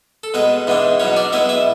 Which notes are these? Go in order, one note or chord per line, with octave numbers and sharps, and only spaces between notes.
A4
B2 G#3 B3 B4
G#2 E3 G#3 B3 D4
B2 F#3 B3 C#4 C#5
D4 D5
B2 G#3 B3 E4 E5
E4 E5